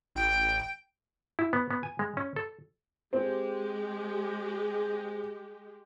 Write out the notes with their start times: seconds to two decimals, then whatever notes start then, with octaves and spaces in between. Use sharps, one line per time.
0.15 A1 G5
1.39 E4
1.53 B3
1.71 B3
1.83 G#5
1.99 G#3
2.17 C#4
2.36 A4
3.13 G#3 C4 G4